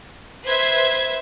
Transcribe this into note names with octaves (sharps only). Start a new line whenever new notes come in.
B4 C5 E5 G#6